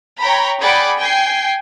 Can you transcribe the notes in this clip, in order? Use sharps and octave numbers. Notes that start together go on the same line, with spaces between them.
C#5 G5 A#5 B5
G#4 D5 F#5 G5 B5 D6
G5 G#5 C7